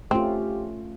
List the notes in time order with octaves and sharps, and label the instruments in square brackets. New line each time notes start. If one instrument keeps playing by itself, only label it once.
[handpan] A3 C#4 F4 [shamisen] C4 [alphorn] G4